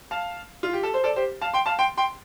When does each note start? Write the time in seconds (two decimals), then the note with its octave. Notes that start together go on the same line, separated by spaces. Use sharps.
0.11 F5 A5
0.63 F4
0.73 G4
0.83 A4
0.94 C5
1.04 A4 D5
1.16 G4 C5
1.41 F5 A5
1.54 G5 C6
1.66 F5 A5
1.79 G5 C6
1.97 G5 C6